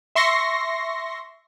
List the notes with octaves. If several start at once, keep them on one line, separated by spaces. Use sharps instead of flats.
E5 C6 C#6 A#6 C7